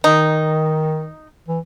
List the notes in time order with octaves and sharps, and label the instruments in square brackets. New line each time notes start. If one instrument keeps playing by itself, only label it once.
[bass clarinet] D#3 [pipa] D#4
[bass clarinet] E3